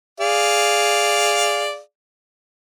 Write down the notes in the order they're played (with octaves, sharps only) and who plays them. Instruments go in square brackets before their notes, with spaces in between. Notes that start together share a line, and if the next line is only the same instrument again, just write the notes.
[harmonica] G#4 D5 F5